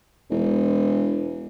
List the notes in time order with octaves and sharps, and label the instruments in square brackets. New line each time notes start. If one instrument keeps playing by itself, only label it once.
[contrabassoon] E1